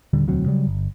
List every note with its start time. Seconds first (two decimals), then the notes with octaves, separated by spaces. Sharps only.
0.13 D#1 D3 G3
0.27 E1 D2 F#3 C4
0.46 C#3 F#3 G3
0.67 G1